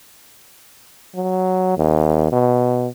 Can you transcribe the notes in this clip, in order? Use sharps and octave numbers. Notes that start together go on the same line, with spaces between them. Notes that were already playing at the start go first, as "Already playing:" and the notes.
F#3
D#2
B2